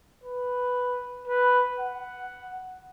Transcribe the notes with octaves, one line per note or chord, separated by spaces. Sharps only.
B4
B4
F#5